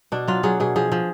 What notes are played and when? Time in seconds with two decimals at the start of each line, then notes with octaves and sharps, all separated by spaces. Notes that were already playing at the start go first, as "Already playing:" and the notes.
0.12 B2 D4
0.28 F#3 F4
0.43 F#3 G#4
0.60 B2 G#4
0.76 F3 G#4
0.92 F3